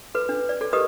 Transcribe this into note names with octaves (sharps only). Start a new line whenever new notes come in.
A4 B4
D4
D5
A4 D5
G4 A#4 B4 D#5 D#6